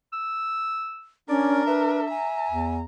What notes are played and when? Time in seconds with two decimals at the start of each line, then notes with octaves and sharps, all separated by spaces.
0.13 E6
1.29 C#4 D4 A#4 D5
1.67 B4 E5
2.10 G#5 A#5
2.50 E2